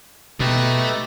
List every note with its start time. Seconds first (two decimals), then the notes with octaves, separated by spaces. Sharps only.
0.40 B2 A3 D#4 G4 B4